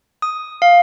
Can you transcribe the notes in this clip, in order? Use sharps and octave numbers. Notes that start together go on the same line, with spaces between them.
D#6
F5